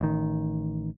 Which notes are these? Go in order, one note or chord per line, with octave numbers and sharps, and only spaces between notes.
A1 D#3